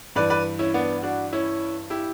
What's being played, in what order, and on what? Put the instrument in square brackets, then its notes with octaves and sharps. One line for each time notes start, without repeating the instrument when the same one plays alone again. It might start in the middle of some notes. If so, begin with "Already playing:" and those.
[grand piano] G2 E3 B4 D5
B4 D5
C#4 E4
B3 D4
D4 F#4
C#4 E4
E4 G4